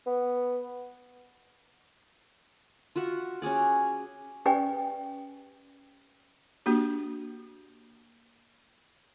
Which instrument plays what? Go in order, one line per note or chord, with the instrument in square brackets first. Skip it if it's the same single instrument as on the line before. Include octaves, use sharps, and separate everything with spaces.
[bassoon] B3
[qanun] F4 F#4 E5 F#5
C#4 F#4 G#4 D5
[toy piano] C#4 G4 B4 D5 G5 G#5
[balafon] A#3 D4 F#4 G4